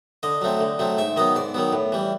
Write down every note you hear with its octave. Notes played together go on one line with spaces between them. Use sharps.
D3 D#5
F#3 A3 C4
D3
F#3 A3 C4
G#2 E5
D#3 F#3 B3 D#5
G#2 D5
D#3 F#3 B3
A2
E3 G3